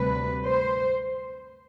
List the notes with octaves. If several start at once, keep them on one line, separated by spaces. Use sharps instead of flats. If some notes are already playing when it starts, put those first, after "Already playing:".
Already playing: D2 C3 G3 B4
C5